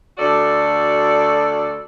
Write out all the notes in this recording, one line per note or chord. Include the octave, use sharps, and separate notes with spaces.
D2 F#4 A4 D5